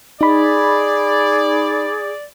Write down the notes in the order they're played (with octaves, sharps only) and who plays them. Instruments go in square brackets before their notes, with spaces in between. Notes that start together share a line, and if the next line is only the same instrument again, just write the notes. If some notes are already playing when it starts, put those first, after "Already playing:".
[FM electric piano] D#4 B5 [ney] G#4 [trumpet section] D5